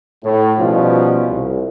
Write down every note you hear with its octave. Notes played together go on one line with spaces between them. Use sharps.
A2
B2 F3 G3 C#4 D#4 F4
C2